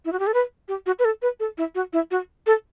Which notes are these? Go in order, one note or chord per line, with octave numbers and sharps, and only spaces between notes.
E4
F#4
G4
A4
B4
G4
F#4
B4
A4
B4
A4
E4
F#4
E4
F#4
A4